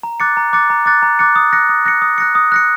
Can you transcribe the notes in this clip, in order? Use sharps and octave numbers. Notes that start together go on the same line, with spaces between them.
A#5
D6 F#6 A6 C#7
A#5
D6 F#6 A6 C#7
A#5
D6 F#6 A6 C#7
A#5
D6 F#6 A6 C#7
D#6
F#6 A#6 C#7
D#6
F#6 A#6 C#7
D#6
F#6 A#6 C#7
D#6
F#6 A#6 C#7